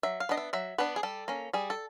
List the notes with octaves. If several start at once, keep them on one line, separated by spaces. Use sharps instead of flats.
F#3 E5
F5
B3 D4 D#5
E5
F#3 E5
B3 D4 B4
G#4
G3 A4
A#3 C#4
G3 G#4
A4